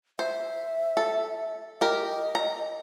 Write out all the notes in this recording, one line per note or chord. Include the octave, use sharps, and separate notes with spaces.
C5 E5
A4
G4 A#4 D#5
A#5